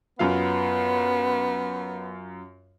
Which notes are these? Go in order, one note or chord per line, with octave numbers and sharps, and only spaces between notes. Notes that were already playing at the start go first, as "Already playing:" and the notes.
F#2 B3 F4 F5